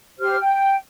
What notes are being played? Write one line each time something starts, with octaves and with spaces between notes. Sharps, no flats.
G4 C5 F6
G5